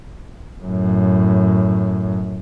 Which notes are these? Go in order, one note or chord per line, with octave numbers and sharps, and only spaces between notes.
F#2 A2